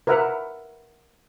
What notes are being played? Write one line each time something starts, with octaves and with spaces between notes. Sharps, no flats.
A#4 B4 E5 F#5